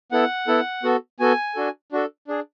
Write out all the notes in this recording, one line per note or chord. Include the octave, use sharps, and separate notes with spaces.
B3 E4 A4 F#5
B3 E4 A4
B3 F#4 A4
B3 F#4 A4 G#5
D4 F#4 A4
D4 F#4 A4
D4 G#4